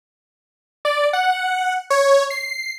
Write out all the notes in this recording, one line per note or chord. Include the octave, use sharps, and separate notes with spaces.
D5
F#5
C#5
C7